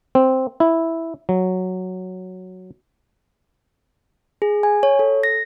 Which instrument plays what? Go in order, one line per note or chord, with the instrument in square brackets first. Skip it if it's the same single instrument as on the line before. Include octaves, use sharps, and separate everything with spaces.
[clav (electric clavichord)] C4
E4
F#3
[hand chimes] G#4
G#5
C#5
A4
A#6